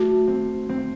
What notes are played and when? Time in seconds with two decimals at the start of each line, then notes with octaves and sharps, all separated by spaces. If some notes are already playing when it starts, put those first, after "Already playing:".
Already playing: A3 F#4
0.28 C4
0.69 C4